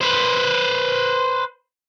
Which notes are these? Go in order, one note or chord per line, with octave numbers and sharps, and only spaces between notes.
B4 C5